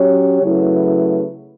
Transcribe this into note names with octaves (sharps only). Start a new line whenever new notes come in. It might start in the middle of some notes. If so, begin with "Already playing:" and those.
Already playing: F#3 C#4 G4 C#5
C#3 F#3 A3 E4 B4